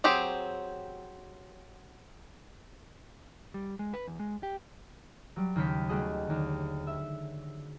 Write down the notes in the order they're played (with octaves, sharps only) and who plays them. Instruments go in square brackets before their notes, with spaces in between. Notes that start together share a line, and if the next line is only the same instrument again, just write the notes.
[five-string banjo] F#3 C4 G4 G#4
[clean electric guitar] G3
G#3
B4
E2
G#3
G4
[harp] F#3 G3
D#2 C#3 G5 B6 C#7
G3 A3 F#4 G#4 D#5
D#2 D3
E5